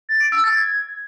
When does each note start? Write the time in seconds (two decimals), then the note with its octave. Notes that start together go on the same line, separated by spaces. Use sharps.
0.09 A6
0.20 D7
0.32 E6
0.44 A6
0.56 G#6